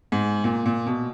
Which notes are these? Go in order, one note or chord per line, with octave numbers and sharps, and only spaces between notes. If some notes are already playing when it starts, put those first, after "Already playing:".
G#2
A#2
A#2
B2